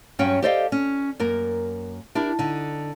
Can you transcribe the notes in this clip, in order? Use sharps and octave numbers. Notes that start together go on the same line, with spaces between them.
G2 F#3 C#4 C#5 F#5 G5
G4 A4 C5 D5 D#5 F5
C#4
F#2 A#3 A#4
D4 E4 G4 A#4
D3 D#4